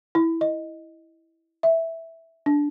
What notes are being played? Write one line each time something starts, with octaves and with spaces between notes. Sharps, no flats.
E4
D#5
E5
D4